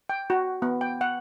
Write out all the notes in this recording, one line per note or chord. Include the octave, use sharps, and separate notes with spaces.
G5
F#4
B3
G5
F#5